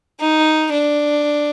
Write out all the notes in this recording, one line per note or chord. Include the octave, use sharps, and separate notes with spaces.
D#4
D4